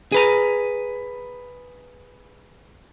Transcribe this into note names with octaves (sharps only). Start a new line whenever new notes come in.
G#4 B4 A#5